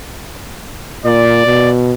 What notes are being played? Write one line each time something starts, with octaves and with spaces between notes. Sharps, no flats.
A#2 D5
B2